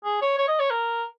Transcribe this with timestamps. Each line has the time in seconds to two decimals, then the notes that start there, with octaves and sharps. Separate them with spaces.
0.05 G#4
0.22 C#5
0.38 C#5
0.48 D#5
0.60 C#5
0.71 A#4